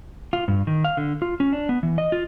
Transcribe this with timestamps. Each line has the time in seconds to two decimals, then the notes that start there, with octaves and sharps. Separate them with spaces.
0.33 F4
0.48 G2
0.67 D#3
0.84 F5
0.97 D3
1.22 F4
1.40 C#4
1.53 D4
1.69 B3
1.83 E3
1.98 D#5
2.12 F4